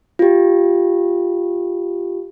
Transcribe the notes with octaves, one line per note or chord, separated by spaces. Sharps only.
F4 G4